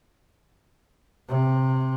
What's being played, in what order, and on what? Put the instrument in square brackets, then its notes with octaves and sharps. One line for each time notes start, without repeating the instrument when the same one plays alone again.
[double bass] C3